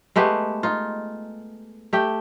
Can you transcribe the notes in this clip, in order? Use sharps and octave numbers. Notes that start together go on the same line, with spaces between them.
G#3 A3 B3 G4
D#4 F4
A3 G4 G5